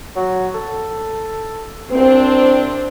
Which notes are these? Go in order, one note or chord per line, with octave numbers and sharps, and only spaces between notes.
F#3
A4
C2 C4 D4